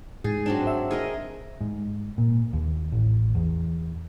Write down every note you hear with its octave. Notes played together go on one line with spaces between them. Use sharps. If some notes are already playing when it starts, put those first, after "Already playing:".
G#2 G#4
F#3 C4 D4
E5
G#4 A#4 D#5
G#2
A#2
D#2
A1
E2